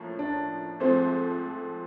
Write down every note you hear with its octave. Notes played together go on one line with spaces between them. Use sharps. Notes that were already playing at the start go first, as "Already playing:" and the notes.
Already playing: A2 F3 A#3 C#4
D4
G#2 F3 A3 C4